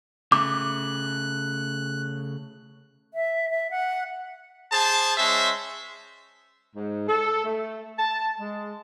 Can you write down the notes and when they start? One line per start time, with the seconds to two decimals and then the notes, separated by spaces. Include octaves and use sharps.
0.32 C#3 A3 D6 F#6
3.14 E5
3.50 E5
3.71 F#5
4.72 G#4 C5 A5
5.17 G#3 C#4 C5 E5
6.75 G#2
7.08 A4
7.45 A3
7.97 A5
8.39 G#3